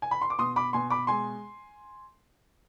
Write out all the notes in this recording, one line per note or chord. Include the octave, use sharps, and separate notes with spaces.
G#5
B5
C6
D6
B2 C6 D#6
B5 D6
B2 G#5 C6
B5 D6
G#3 G#5 C6